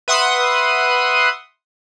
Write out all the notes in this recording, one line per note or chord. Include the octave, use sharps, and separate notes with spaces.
B4 E5 F#5 C6 D#6